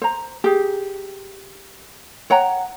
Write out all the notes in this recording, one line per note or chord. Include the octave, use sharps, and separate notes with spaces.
C5 A#5
G4 G#4
C#5 F#5 G5 A#5